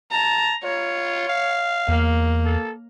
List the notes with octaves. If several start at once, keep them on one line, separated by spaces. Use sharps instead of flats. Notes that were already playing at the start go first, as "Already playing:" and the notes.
A5 A#5
F4 C#5
F5
E2 A#3
A4